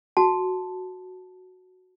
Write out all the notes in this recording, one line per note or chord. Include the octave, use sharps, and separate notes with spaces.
F#4 A5